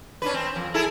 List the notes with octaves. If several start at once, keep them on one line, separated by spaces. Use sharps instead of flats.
C#4 D4 B4
C4
F2
E4 G#4 A4